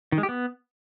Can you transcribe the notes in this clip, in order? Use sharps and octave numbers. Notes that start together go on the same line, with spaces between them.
D#3
G#3
G4
B3